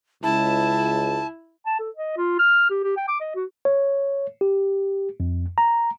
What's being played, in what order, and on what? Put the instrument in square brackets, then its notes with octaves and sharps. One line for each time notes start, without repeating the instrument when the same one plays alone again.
[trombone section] C#2 [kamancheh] E4 [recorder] A5
[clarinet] A5
A4
D#5
F4
F6
G4
G4
G5
D6
D#5
F#4
[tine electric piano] C#5
G4
F2
A#5